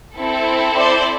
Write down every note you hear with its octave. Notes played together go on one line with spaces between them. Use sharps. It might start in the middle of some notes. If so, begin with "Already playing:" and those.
C4 E4 A4
C5 D5